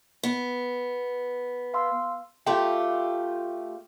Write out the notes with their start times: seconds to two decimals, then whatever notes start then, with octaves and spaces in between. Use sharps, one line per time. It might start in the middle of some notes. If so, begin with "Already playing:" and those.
0.23 B3
1.74 F5 C6 E6
2.47 A3 F4 G4